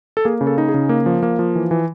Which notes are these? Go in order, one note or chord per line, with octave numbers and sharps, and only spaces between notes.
A4
A#3 G#4
C#3
A4
D#4
G#4
C#3
A#3
F3
A#3
F3
E3
E3